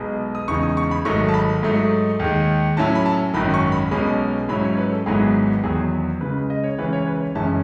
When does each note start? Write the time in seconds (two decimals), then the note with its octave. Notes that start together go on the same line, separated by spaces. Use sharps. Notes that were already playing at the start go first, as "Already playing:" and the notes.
Already playing: B1 B2 G#3
0.35 D#6
0.48 E2 C#3 G#3 D#4 C#6
0.63 D#6
0.77 C#6
0.91 B5
1.05 G#1 G#2 F#3 A3 D#4 C#6
1.28 A5
1.34 B5
1.63 G#2 F#3 A3 D#4
2.19 D#2 D#3 G#3
2.77 A2 F#3 C#4 E4 A5
2.95 B5
3.06 A5
3.34 G#1 F#2 D#3 F#3 C#4 B5
3.54 C#6
3.72 B5
3.91 B1 B2 G#3 C#4 B5
4.49 G#2 F#3 C#4 E4 B5
4.63 C#5
4.77 B4
4.92 A4
5.06 G#1 G#2 F#3 B3 E4 G#4
5.63 E2 D#3 F#3 B3 G#4
6.21 C#2 C#3 G#3 B4
6.50 D#5
6.64 C#5
6.78 C#2 C#3 E3 B4
6.93 C#5
7.07 B4
7.21 C#5
7.35 F#1 F#2 E3 G#3 C#4 A5